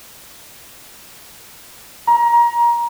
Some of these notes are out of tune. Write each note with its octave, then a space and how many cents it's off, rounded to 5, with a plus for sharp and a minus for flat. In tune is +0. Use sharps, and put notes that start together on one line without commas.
A#5 +25